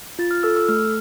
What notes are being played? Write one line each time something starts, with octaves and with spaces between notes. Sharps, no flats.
F4 A6
F6
A4 E6
E6
A3 F6